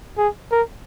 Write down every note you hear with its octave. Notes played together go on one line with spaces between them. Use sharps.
G#4
A#4